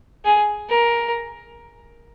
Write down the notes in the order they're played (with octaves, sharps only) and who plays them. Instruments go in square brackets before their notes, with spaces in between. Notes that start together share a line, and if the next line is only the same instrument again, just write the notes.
[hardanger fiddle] G#4
A#4